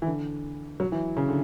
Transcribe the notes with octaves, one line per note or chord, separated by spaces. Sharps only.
E3
D3
F#3
E3
C#3
D3